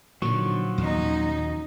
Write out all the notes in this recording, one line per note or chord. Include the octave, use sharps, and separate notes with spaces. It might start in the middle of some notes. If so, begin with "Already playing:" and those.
A#2 D3 D#3 F3 F#3 C#6
D#2 C#4 D#4